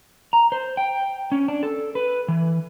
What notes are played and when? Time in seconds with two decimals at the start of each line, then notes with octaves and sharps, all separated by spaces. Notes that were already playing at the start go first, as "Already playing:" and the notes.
0.33 A#5
0.52 C5
0.77 G5
1.32 C#4
1.48 D4
1.63 A4
1.95 B4
2.28 E3